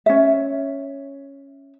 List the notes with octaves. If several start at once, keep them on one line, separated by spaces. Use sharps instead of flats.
C#4 E5